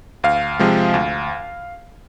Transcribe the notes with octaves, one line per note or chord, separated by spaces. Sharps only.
D2 F5
C3 F3 G#3
D2